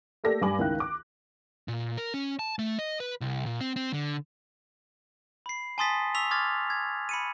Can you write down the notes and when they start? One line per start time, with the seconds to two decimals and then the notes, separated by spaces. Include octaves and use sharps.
0.24 A3 A#3 G4 A4 D5 A#6
0.41 G2 G3 G#5 B5 D6 F#7
0.59 C#2 D#3 E4 F5 G5 F#6
0.80 D6
1.68 A#2
1.97 A#4
2.14 C#4
2.39 A5
2.59 A3
2.79 D#5
3.00 B4
3.21 C2
3.46 A#2
3.61 C4
3.76 C4
3.93 D3
5.46 B5 C7
5.78 G#5 A5 C6 D#6 A6 B6
6.15 C#6 E6 B6 F7
6.31 C6 D6 F6 G#6 A6
6.70 G#6
7.09 B5 C#7 D#7